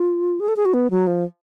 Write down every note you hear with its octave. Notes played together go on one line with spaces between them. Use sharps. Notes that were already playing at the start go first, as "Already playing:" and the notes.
Already playing: F4
G#4
A4
G#4
F#4
B3
F#3
F3